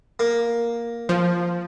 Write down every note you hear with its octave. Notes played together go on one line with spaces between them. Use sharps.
A#3
F3